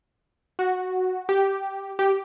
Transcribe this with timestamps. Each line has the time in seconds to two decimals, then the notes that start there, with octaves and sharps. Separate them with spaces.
0.59 F#4
1.29 G4
1.99 G4